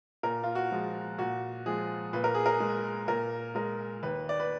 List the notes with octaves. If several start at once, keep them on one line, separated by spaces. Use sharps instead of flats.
A#2 A#4
F4
F#4
F3 G#3
A#2 F#4
F3 G#3 G#4
A#2 B4
A#4
G#4
A#4
G#3
A#2 A#4
G#3 A#4
D#2 B4
D5
B4